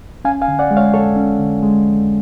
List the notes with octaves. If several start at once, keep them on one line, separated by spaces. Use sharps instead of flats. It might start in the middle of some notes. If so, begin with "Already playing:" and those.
C#4 F5 G#5
F5 G#5
D3
D5 F#5
G#3
C#5 F5
F2 A4 C#5
C#4
D3
G#3
F2